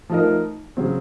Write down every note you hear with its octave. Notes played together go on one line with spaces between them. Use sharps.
F3 A3 D#4 A#4 D#5
C#3 F#3 C4